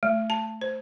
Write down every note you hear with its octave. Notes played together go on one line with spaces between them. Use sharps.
A3
A5
C5